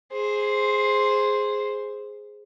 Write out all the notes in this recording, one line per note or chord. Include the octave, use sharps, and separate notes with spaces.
G#4 C5